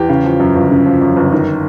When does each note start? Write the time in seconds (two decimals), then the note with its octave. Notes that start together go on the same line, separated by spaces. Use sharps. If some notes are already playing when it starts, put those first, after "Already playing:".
Already playing: E2 G4
0.09 C#3
0.24 F3
0.40 F#2
0.55 G1
0.71 C#3
0.86 F3
1.01 F#2
1.16 G1
1.32 D#3